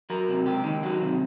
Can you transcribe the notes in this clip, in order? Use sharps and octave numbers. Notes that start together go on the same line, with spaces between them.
F#3 A#4
C3
C#2 G4
D#3
F#3 F#4
C3